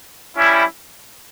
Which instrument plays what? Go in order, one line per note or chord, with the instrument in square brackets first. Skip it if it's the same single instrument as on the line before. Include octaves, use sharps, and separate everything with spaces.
[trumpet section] G3 C#4 E4